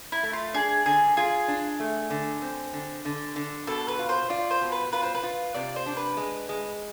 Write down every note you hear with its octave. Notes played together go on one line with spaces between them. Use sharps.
E4
A3
F4
D4 G#4
D3 G#4
F4 G#4
D4
A3
D3
C4
D3
D3
D3
B2 A4
B4
F4
C5
F4 D5
C5
B2
B4
F4 B4
C5
B4
F4
C3 D5
C5
D4
B4
G#3
G#3